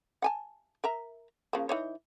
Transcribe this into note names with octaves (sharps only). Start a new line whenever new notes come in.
F#5 G#5 A5
A#4 E5 A#5
C#3 F3 A#3
E3 D#4 C#5